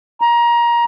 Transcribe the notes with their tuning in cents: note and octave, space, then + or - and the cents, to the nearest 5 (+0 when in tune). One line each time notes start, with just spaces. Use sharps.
A#5 +25